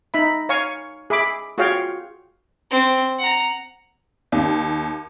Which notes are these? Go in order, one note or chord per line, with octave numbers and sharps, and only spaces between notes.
D#4 E5 B5
C#5 F5 G#5 C#6
G#4 E5 B5 D6
F4 F#4 G#4 C#5 F5 G5
C4
F#5 A#5
D#2